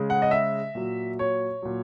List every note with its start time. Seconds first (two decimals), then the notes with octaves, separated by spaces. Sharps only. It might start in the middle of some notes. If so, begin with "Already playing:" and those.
Already playing: C#3 G#3
0.10 F#5
0.22 D#5
0.31 E5
0.75 A#2 F#3
1.19 C#5
1.62 A#2 F#3